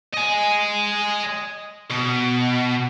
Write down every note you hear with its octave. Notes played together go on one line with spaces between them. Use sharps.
D#5 G#5
B2